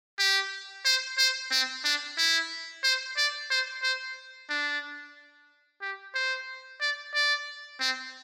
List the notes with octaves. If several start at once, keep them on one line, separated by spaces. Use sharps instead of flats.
G4
C5
C5
C4
D4
E4
C5
D5
C5
C5
D4
G4
C5
D5
D5
C4